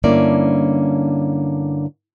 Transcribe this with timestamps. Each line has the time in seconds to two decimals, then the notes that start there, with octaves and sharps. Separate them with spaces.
0.04 G2 D3 A#3 C#4 E4 D5